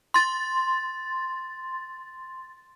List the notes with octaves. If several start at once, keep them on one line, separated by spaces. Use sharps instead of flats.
C6 A6